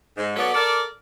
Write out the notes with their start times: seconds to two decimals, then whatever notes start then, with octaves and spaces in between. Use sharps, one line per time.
0.17 G#2
0.36 F#3 B3 A4 C#5 D5
0.54 A4 A#4 D5